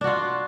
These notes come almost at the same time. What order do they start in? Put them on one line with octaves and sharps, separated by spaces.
D4 F#4 F4